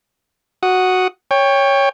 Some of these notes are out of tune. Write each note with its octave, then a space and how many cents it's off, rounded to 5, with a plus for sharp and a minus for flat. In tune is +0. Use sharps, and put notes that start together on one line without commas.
F#4 +0 F#5 +0 D#6 +0
C#5 +0 G5 +20